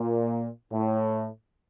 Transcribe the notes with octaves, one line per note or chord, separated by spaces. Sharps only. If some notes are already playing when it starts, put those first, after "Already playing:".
Already playing: A#2
A2